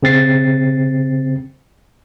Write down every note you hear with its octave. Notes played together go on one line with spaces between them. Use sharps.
C#3 C4 A6 C7